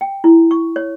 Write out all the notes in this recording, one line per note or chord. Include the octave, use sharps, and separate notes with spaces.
G5
E4
C#6
C#5